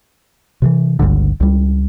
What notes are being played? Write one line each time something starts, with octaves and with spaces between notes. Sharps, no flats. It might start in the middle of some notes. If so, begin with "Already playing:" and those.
C3 D#3 E3
G1 C#2 G2 D3
C#2 G3